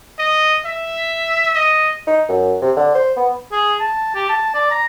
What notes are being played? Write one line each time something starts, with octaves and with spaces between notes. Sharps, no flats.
D#5
E5
D#5
D#4
F#2
C3
D3
C5
B3
G#4
A5
G4
A5
D5
A#5